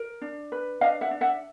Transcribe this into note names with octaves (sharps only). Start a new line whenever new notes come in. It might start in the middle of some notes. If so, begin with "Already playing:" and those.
Already playing: A#4
D4
B4
D4 D#5 F5
E5 F#5
D4
E5 F#5